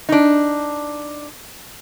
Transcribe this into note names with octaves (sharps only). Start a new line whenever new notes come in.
D4 D#4